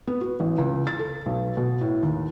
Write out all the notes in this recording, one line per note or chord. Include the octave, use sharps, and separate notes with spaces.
B3
F#4
A1
C#2
A6
A4
B1
B2
A2
D#2